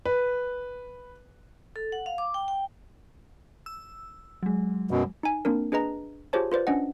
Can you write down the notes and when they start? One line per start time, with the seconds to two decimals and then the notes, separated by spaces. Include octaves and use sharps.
0.05 B4
1.76 A4
1.92 F#5
2.06 F5
2.18 D6
2.34 G5
2.48 G5
3.66 E6
4.43 F#3 G#3
4.91 F#2 B2
5.23 D#4 G#5
5.45 A#3 C4 D4 A#4
5.72 D4 G#4 B4 D#5 A#5
6.33 F4 G4 G#4 C5 C#5 A5
6.52 F4 B4 C5 D5
6.67 C#4 D4 D#5 F#5